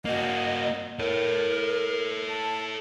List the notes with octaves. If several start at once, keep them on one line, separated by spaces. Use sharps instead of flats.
A#3 F#4 D#5
A4 A#4 C#5
A5